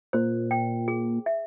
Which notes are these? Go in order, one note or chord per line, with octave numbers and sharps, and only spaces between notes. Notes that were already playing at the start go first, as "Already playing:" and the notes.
A#2 C5
G5
G#4
E5